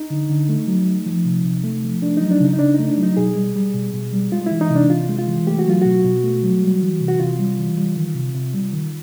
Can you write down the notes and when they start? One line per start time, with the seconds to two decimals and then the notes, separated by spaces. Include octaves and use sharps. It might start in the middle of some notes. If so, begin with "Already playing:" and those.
Already playing: D#4
0.10 D3
0.29 D3
0.49 A3
0.67 F#3
0.86 A3
1.06 F3
1.25 C3
1.45 C3
1.64 A3
1.83 F3
2.02 A3 D4
2.17 F#3 D#4
2.31 D4
2.40 C#3 D#4
2.53 D#4
2.59 C#3 D4
2.74 A3 D#4
2.88 D4
2.98 F#3 D#4
3.17 B2 G#4
3.36 G3
3.56 G3
3.74 B2
3.93 B2
4.13 G3
4.32 G#3 F4
4.46 E3 E4
4.61 D#4
4.70 C3
4.75 D4
4.90 C3 F4
5.09 G#3
5.19 F4
5.28 E3
5.47 A3 G4
5.59 F#4
5.66 F#3 F4
5.81 B2 F#4
6.05 B2
6.24 A3
6.43 F#3
6.62 G3
6.82 E3
7.00 C3
7.08 F#4
7.20 C3 F4
7.39 G3
7.58 E3
7.77 G3
7.96 D#3
8.15 C3
8.35 C3
8.54 G3
8.73 D#3